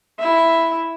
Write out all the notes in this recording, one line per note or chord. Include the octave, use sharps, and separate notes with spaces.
E4 E5